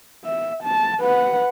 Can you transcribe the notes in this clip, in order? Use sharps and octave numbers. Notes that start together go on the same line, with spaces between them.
E5
A5
B4 F#5